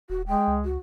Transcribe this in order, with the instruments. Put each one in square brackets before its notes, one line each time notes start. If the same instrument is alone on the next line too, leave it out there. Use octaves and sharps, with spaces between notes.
[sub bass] D#1 [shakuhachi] F#4
[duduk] G#3 [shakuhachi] G5
[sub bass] C#2
[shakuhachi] F#4